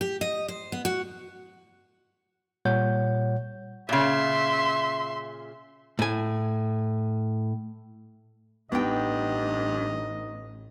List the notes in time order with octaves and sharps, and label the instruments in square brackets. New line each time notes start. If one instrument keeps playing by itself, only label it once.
[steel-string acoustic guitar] G4
D#5
C5
B3
F#4
[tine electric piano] A#2 G3 C#5 F#5 G6
[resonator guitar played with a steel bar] A#2 C#3 [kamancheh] E5 C6
[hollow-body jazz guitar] A2 G#5
[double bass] A1 [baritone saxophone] G2 [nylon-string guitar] B3 D#4 G5 [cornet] D#5